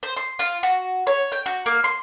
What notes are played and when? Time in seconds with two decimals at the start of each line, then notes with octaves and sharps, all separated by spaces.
0.03 C5
0.17 C6
0.39 F4
0.63 F#4
1.07 C#5
1.32 G5
1.46 F#4
1.66 A#3
1.84 C6